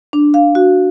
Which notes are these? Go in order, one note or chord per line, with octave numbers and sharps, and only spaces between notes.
D4
F5
F#4